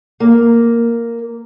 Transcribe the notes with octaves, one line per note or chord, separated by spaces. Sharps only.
A#3